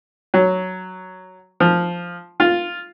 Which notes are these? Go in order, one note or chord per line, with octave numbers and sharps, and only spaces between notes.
F#3
F3
F4